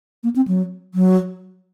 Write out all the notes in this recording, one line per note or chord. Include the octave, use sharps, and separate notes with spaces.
A#3
C4
F#3
F#3